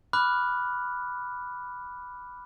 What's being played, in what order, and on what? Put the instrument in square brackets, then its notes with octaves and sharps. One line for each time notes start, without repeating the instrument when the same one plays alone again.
[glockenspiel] B5 D6 F6 F#6